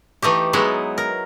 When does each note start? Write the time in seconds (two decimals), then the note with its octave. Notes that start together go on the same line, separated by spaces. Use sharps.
0.22 E3 A3 D#4 G4
0.53 F#3 G#3 B3 D#4 E4
0.98 A#4